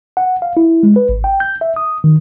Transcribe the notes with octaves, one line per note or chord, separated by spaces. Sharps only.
F#5
F5
E4
G#3
B4
G#1
G5
G6
E5
D#6
D#3